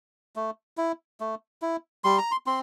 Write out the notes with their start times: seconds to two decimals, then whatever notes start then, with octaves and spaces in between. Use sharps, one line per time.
0.36 A3
0.77 E4
1.20 A3
1.62 E4
2.04 G3 C6
2.18 A#5
2.32 C6
2.46 C4 C6